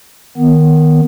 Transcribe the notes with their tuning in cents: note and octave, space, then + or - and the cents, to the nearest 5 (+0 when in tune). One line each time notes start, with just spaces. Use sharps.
D#3 +0 B3 +0